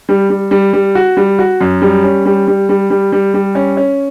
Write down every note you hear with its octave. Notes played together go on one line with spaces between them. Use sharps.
G3
G3
G3
G3
F#4
G3
F#4
F#2
G3
C#4
G3
G3
G3
G3
G3
G3
C#4
C#4